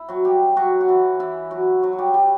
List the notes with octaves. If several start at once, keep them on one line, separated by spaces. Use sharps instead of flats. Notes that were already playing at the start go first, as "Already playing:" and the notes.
Already playing: E4
F#3 F#4
G3 G4
F#3 F#4
F#4
E3 E4
E3 E4
F#3 F#4
F#3 F#4
F#4
G3 G4
G3 G4